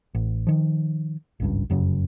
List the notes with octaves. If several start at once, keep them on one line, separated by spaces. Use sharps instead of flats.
A1
D#3 F3
G#1 C#2 G2
F1 F#2 C#3